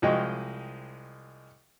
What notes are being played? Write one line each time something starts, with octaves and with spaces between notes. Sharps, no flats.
C2 F3 G#3 F#4 D#5 G5